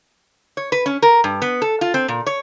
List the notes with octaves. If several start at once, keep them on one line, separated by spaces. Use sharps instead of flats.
C#5
B4
C#4
A#4
G2
B3
A4
F4
C4
A#2
C#5